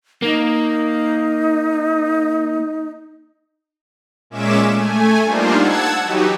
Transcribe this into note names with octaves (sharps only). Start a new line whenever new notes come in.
A#3 D#4
A#2 G#3 C#4 E5 D6 E7
A3 G#5
G3 A#3 D4 D#4 F4 C5
F#5 A5 E6 G#6
E3 F#3 D#4 F#4 G4 B4